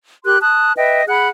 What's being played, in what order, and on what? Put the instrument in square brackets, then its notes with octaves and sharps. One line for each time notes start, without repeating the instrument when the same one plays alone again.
[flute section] G4 A#4 C6 F#6
A5 D#6 F#6
B4 D#5 E5 G5
G#4 F#5 B5 F#6